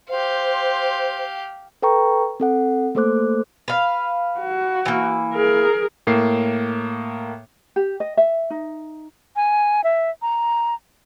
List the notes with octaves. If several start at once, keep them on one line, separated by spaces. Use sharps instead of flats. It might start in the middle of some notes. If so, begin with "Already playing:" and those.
G4 C5 F5
A4 B4 G5 A#5 C#6
C4 A4 F#5
A3 A#3 A4 C5 D6 F#6
B4 F5
F#4
E3 A#3
G#4 A#4
A2 A#3 C7
G4
D#5
E5
D#4
G#5
E5
A#5